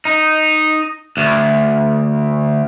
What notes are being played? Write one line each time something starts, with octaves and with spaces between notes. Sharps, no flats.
D#4
D2